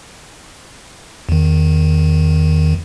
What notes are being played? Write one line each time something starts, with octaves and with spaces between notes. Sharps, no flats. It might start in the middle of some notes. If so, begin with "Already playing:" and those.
E2 D#3